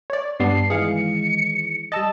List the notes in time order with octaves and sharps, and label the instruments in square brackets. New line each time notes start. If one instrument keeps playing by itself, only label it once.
[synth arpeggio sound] C#5 D5
[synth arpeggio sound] G2 G3 B3 [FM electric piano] D5 A5 [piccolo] C7
[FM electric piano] D#3 E3 G#3 [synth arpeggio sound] G#4 F5 [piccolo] C#7
[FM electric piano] G3 E6 A6 [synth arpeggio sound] D#5 A5